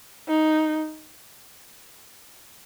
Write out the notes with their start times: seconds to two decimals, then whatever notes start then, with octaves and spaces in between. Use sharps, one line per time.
0.28 D#4